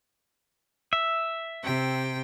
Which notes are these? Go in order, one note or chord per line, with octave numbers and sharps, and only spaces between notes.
E5
C3 G5